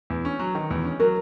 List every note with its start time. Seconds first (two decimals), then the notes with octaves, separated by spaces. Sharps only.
0.10 E2
0.25 C#4
0.39 F#3
0.55 D#3
0.70 E2
0.85 C#4
1.00 F#3 A#4